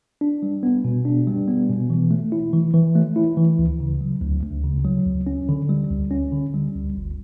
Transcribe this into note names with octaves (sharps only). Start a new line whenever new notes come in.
D4
G3
B3
B2
D4
G3
B3
B2
E3
A3
E4
E3
E3
A3
E4
E3
D2
C#3
F#3
D2
D2
C#3
F#3
D2
C#4
D3
G3
D2
C#4
D3
G3
D2
G1